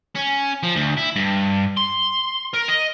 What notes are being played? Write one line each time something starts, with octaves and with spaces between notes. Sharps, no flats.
C#4
F3
D2
E4
G2
C6
A#4
D#5